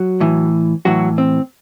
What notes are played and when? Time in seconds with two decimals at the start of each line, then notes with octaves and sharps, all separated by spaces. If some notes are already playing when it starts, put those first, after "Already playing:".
Already playing: F#3 F#4
0.20 A2 E3
0.85 A2 E3 F#3 F#4
1.18 C4